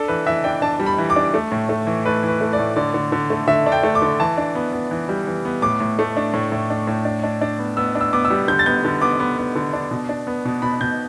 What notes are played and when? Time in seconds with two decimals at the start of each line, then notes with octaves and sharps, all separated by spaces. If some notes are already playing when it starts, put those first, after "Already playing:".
Already playing: D4 A4
0.08 E3 B4
0.26 E3 E5
0.44 D4 G5
0.62 D4 A5
0.80 G3
0.86 B5
0.98 E3
1.10 D6
1.16 D4
1.34 A3
1.52 A2
1.69 A3
1.87 E3
2.05 A3 B4
2.23 E3
2.28 B4
2.41 A3
2.53 D5
2.59 A2
2.76 D3 D5
2.94 D3
3.12 D3
3.30 A3
3.47 D3 E5
3.66 D4
3.72 G5
3.83 A3
3.95 D6
4.02 D3
4.20 E3 A5
4.38 D4
4.55 B3
4.73 B3
4.91 E3
5.09 G3
5.27 E3
5.45 B3
5.62 A2 D6
5.80 A2
5.99 A3
6.17 D4
6.34 A2
6.52 A2
6.70 D4
6.87 A2
7.05 D4
7.24 D4
7.41 D4
7.59 B3
7.77 B3 E6
7.95 D4
8.01 E6
8.13 B3 D6
8.25 E6
8.30 G3
8.48 D3 G6
8.59 A6
8.66 B3 G6
8.85 D3
9.01 B3 D6
9.20 B3
9.38 B3
9.56 D3
9.73 D4
9.91 B2
10.09 D4
10.27 B3
10.45 B2
10.62 B2 B5
10.81 B2 G6